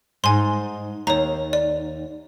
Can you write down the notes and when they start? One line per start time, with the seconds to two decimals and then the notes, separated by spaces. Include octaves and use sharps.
0.24 G#2 G#5 C6
1.07 D#2 C#5 A#5
1.53 D5